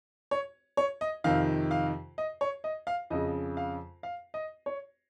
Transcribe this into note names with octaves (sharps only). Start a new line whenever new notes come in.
C#5
C#5
D#5
F2 C3 D#3 F5
F5
D#5
C#5
D#5
F5
F2 C#3 D#5
F5
F5
D#5
C#5